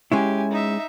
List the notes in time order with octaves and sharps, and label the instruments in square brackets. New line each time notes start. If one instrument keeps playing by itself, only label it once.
[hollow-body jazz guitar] G#3 C#4 E4 [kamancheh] G4 G#5
[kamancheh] D#4 E5